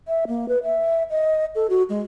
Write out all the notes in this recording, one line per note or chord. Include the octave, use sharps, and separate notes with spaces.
E5
A#3
B4
E5
D#5
A4
F#4
G#3